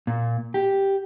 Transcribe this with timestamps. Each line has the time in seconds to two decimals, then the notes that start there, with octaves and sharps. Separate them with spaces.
0.07 A#2
0.54 G4